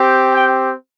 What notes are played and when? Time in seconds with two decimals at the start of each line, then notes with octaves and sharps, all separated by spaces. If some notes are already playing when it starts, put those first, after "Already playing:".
Already playing: C4 G4
0.33 G5